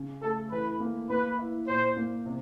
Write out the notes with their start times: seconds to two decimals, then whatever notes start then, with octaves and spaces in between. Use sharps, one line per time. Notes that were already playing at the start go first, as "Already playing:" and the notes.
Already playing: C#3
0.22 A3 A4
0.51 E3 B4
0.80 A#3
1.10 A#3 B4
1.39 E4
1.68 A#2 C5
1.97 A#3
2.26 C3